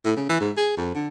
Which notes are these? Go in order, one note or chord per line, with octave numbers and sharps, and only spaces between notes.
A2
C#3
E3
G#2
G#4
F2
D3